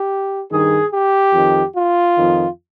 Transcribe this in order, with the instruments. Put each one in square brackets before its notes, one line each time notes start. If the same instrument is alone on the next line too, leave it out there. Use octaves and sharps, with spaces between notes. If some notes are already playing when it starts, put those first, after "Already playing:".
Already playing: [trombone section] G4
G2 D#3 G#4
G4
F2 D#3
F4
F2 D#3